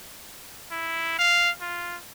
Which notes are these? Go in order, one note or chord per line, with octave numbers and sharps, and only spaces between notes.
E4
F5
F4